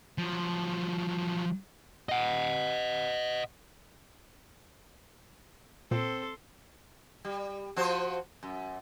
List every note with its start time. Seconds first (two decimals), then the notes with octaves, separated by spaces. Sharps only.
0.18 F3 F#3
2.09 D#5 F#5
5.91 A#2 C4 A4 C6
7.25 G3
7.76 F3 F#4 C5
8.43 F#2